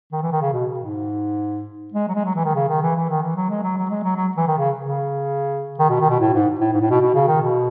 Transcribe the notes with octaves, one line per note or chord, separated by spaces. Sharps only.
D#3
E3
D#3
C#3
B2
G#2
G#3
F#3
G#3
F#3
E3
D#3
C#3
D#3
E3
E3
D#3
E3
F#3
G#3
F#3
F#3
G#3
F#3
F#3
E3
D#3
C#3
C#3
D#3
B2
D#3
B2
A2
G#2
A2
G#2
A2
B2
B2
C#3
D#3
B2